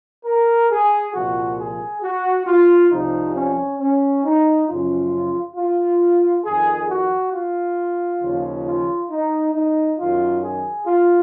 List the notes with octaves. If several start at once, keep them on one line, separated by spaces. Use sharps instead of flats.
A#4
G#4
C2 A#2 F3 F#4
G#4
F#4
F4
C2 C3 F3 D#4
C#4
C#4
D#4
F#2 C#3 F3 F4
F4
F2 D#3 G#4
F#4
F4
D#2 C#3 F3
F4
D#4
D#4
F#2 D#3 F4
G#4
F4